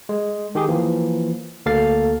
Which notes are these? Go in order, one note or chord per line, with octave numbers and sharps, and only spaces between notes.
G#3
D#3 G4 G#4
E3 F3 A#3
D2 A#3 A4 F5 A6